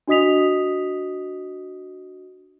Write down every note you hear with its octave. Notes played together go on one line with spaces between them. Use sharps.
D4 F#4 D#5 D#6 B6 F7